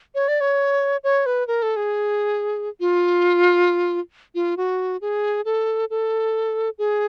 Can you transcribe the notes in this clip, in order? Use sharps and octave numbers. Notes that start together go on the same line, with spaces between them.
C#5
D5
C#5
C#5
B4
A#4
A4
G#4
F4
F4
F#4
G#4
A4
A4
G#4